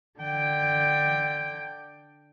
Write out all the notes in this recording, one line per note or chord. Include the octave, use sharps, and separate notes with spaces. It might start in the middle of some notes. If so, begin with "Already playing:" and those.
D3 G5